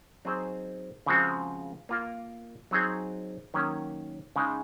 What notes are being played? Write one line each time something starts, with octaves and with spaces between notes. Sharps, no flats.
F#3 C4 D#4 G#4 C5
C#3 F3 G#3 C4 F#4
A#3 F4 A#4
F#3 C4 D#4 G#4
D#3 F#3 A#3 C#4
C#3 G#3 D#4